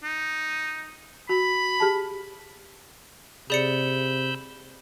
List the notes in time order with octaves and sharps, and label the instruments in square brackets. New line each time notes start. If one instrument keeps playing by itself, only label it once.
[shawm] D#4
[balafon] F#4 [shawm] B5
[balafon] G4 G#4 A5
[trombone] C3 [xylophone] G#4 D5 C#7 [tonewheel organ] B5 E6 G6